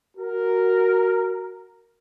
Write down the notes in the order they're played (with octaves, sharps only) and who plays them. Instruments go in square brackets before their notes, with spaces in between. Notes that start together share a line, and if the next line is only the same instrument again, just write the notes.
[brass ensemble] F#4 A#4